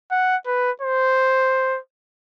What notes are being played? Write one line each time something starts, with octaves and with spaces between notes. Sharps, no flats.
F#5
B4
C5